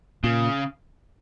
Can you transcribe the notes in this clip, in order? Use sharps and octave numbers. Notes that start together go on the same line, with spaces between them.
A#2 C#3